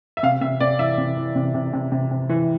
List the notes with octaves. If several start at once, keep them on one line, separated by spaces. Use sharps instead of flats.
E5
C3 F5
C3 E5
C3 D5
E3 E5
C3
E3
C3
C3
C3
C3
C3
E3